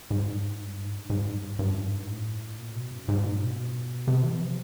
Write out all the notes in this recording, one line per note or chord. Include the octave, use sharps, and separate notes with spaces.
G#2
G2
G#2
G#2
G2
G2
G#2
A2
A#2
B2
F#2
G#2
A#2
B2
C3
E3
F3